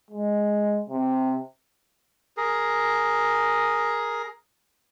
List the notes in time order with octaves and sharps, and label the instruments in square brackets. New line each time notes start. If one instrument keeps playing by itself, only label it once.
[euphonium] G#3
C3
[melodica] G#4 A#4